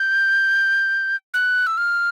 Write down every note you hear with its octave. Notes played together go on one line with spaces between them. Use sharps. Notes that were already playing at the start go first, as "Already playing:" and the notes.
Already playing: G6
F#6
E6
F6